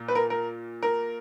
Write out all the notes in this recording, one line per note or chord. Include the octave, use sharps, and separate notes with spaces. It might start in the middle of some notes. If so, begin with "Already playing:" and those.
Already playing: A#2 A#3
B4
A#4
A#4
A#4